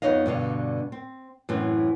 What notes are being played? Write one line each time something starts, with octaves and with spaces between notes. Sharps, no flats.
F2 B3 D#4 C#5 D#5 F5
G2 B2 D3 F5
C4
F#2 A2 E3 C4